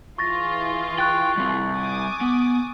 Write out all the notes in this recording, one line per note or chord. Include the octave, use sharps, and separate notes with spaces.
E3 F4 G#4 C#6 A6 A#6
G5 C#6 F#6 A6
G3 C4
G#5 D6 D#6
B3